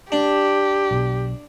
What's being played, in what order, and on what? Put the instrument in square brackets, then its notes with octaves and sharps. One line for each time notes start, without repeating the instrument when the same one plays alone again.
[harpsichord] D4 [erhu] G4
[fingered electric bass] B1 B2